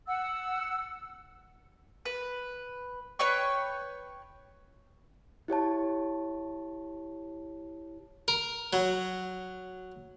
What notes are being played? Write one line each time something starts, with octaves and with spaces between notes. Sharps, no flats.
F#5 E6
B4
B4 C#5 G5 C#6
E4 G4 C#5 A5
A#4
F#3